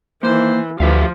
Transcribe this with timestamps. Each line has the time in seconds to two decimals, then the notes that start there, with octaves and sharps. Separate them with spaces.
0.23 D#3 E3 A#3 C5
0.80 D2 E3 F3 G4 E5 F5